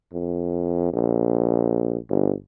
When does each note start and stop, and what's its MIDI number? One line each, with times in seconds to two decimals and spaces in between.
0.13 0.92 41
0.93 1.97 34
2.10 2.33 31